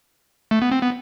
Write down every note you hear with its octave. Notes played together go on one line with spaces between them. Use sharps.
A3
B3
C4
B3